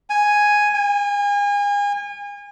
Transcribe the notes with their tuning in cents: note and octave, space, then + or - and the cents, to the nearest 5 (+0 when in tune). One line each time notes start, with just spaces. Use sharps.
G#5 +0
G#5 -35